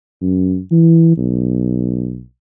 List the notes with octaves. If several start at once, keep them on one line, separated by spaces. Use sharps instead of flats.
F#2
E3
B1